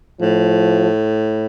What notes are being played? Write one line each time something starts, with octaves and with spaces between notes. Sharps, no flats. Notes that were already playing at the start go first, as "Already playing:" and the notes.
A2 F3